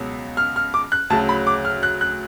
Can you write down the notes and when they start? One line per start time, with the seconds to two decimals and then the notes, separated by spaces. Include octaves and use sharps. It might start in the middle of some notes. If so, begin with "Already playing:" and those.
Already playing: C#2 B2 F#3
0.37 F6
0.56 F6
0.74 D6
0.92 F#6
1.10 D2 C#3 F#3 A5
1.29 B5
1.47 D6
1.65 F6
1.83 F#6
2.01 F#6